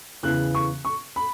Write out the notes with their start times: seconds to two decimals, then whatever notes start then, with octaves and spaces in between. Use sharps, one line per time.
0.23 E2 C#3 E3 F#6
0.55 C#6
0.85 C#6
1.16 B5